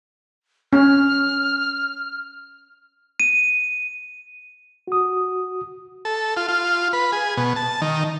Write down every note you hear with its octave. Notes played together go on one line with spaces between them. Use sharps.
C#4 F6
D#7
F#4 D#6
A4
F4
F4
B4
G#4
B2
A5
D#3